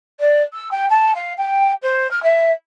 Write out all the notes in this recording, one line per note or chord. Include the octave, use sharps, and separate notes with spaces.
D5
E6
G5
A5
F5
G5
C5
F6
E5